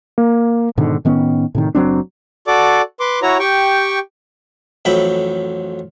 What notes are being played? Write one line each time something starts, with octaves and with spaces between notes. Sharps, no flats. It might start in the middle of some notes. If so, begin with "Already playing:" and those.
A#3
G#2 B2 D3 D#3
A2 D#3 B3 C#4
A2 C3 D#3
F#1 F#3 C4 D4
F#4 A4 D5 D6
B4 C6 D6
E4 F#4 C#5 A#5
G4 G5 C#6
A1 F2 F#3 E5 G5 B5